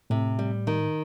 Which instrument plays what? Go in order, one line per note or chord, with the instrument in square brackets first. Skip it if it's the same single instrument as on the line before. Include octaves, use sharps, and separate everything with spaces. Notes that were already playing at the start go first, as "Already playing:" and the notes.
[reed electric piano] A2 [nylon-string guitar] C3
[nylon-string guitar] G3
D#3